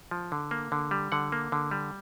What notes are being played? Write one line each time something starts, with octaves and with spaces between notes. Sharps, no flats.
F3
D3
A#3
D3
G3
D3 F#5
A#3
D3
G3